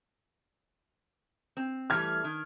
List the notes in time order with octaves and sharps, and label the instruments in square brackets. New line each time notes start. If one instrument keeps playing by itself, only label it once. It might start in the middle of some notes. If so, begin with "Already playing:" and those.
[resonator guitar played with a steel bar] C4
[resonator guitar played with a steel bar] E3 G3 A3 [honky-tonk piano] F6 G#6
[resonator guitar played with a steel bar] D#3